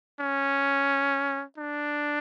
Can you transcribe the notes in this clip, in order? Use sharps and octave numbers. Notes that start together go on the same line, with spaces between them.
C#4
D4